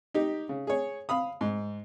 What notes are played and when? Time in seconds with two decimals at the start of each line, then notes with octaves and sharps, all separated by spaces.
0.14 D#4 G4
0.49 C#3
0.67 G#4 C#5
1.09 F5 B5 D#6
1.41 G#2